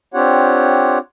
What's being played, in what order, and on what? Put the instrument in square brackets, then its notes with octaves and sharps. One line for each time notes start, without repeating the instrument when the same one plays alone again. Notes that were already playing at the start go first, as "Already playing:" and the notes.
[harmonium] C4 D4 F4 G4 C#5 F#5